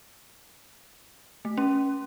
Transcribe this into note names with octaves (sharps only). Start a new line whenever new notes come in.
A3
C#4